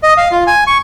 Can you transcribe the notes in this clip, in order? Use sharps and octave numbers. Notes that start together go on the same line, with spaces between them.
D#5
F5
F4
G#5
C#6